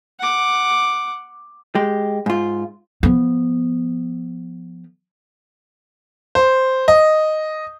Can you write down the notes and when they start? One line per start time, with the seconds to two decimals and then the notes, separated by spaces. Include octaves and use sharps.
0.20 F#5 D6
1.75 G#3 G4
2.26 G#2 F4
3.03 F3 B3
6.35 C5
6.88 D#5